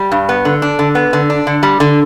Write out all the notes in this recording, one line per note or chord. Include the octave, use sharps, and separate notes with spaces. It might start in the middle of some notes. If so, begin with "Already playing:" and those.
Already playing: G3
G2
B3
D3
D4
D3
B3
D3
D4
D3
G3
D3